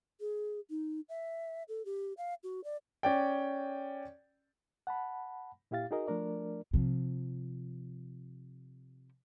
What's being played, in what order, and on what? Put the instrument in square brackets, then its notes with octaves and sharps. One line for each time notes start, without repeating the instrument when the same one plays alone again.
[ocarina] G#4
D#4
E5
A4
G4
F5
F#4
D5
[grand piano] C#4 D5 G5
[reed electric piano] F#5 A5 B5
A#2 E4 G4 F5 A6
D#4 F#4 G#4 A#4 D#5
F3 A3 D4 A#4 D5
[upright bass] C3 F3